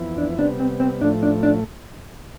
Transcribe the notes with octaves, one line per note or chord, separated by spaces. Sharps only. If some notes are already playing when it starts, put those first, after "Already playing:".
Already playing: F2 E3 B3 E4
D4
C3 G3 B3 D4
C4
C4
A2 F3 A3 D4
D4
D4